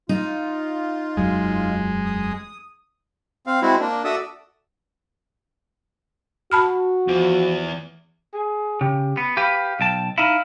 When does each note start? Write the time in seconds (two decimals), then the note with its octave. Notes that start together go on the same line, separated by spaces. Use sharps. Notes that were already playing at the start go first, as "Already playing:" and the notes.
0.09 D#4 F4
1.17 E1 F#2 F#3 G#3
2.05 D#6
3.47 C4 F5
3.62 G#3 C4 E4 F#4
3.80 A#3 D4
4.05 F#4 A4 D5 E5 D#6
6.52 F#4 A5 B5 F6
7.08 E2 F3
8.34 G#4
8.81 C#3 G4
9.17 B3
9.37 G4 B4 F5
9.80 B1 G5 A5
10.18 D#4 E4 F5